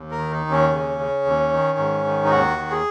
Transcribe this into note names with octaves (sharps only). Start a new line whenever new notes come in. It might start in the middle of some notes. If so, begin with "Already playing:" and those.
Already playing: D#2
A#4
D#3
D#4
D#2
C#4
C#3
C#3
D#2
D#3
G#2
D#3
D#4
D#2 F#4
D#3
G#4